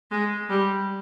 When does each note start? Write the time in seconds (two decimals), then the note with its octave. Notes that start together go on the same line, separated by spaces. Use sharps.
0.11 G#3
0.49 G3